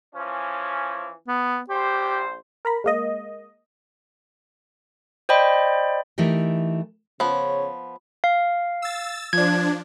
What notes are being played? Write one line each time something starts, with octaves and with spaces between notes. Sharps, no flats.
E3 F3 C#4
B3
A#1 G4 C5
A#4 A#5 B5
G#3 A#3 D#5
C5 D5 D#5 G5 B5
E3 A3 D#4 G4 A#4
C#3 F3 B3 C#5
F5
E6 A6
F3 D4 G#6